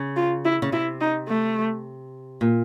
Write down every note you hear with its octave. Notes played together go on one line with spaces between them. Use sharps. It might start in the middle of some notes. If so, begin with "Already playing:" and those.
Already playing: C#3
F4
E4
C#3
C3 E4
D#4
A3
A#2